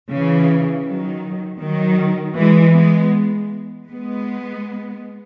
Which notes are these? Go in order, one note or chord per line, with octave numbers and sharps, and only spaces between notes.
C#3 E3
D#3 F#3
D#3 F#3
E3 G#3
G#3 B3
G#3 B3